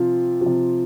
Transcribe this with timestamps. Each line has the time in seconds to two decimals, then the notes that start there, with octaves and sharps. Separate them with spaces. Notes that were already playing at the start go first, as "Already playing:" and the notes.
Already playing: C3 F3 F4
0.41 F3
0.46 C3